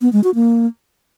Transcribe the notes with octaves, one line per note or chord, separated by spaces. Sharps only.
B3
G#3
F#4
A#3